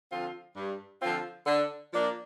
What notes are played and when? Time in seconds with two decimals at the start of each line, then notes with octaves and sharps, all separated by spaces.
0.11 D3 F3 C4 F4
0.57 G2
1.02 D3 F3 C4 F4
1.46 D3
1.92 F3 A#3 D4